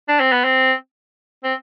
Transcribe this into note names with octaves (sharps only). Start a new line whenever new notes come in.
D4
C4
B3
C4
C4